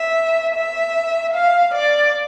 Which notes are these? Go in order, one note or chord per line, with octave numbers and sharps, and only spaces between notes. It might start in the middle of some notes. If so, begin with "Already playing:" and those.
Already playing: E5
E5
F5
D5